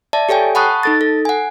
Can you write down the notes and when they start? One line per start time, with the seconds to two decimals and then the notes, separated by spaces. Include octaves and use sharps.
0.13 D5 E5 A5
0.29 G4 A4 C#5 G5 G#5
0.55 F#5 A5 B5 C#6 D#6 F#6
0.83 D#4 A4 A6
1.01 A4
1.25 F#5 G#5